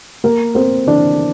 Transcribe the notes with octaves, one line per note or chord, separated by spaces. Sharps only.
A#3 A#4
A#3 C4 C5
E3 D4 D5